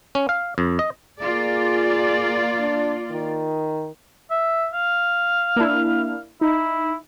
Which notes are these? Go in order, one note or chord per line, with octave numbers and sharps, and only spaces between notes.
C#4
F5
F2
D#5
A#3 F4 G#4 D5
D4
D#3
E5
F5
A#3 D4 E4
D#4 E4